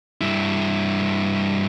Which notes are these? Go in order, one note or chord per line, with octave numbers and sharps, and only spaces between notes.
G2 E4